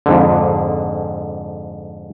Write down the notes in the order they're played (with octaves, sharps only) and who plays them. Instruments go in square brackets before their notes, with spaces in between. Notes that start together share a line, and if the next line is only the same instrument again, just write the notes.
[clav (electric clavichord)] F2 G#2 D3